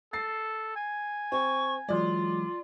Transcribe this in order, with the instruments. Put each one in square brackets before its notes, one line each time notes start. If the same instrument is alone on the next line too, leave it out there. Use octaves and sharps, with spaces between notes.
[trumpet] A4 [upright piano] A6 C7
[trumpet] G#5
[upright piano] C4 [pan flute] C#6
[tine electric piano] E3 F#3 G#3 [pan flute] F4 [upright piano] D5